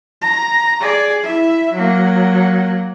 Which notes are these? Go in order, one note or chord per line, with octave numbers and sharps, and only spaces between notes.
A#5
G#4 D5
E4 E5
F#3 A#3